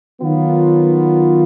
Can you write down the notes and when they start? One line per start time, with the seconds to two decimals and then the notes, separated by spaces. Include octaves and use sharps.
0.21 D#3 F#3 B3 F4